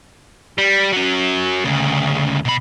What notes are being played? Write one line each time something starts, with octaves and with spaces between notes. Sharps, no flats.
G3
F#3 C#4
D2 C#3
B2 B5